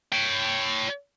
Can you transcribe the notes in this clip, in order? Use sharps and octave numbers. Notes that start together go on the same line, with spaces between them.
C#5 G5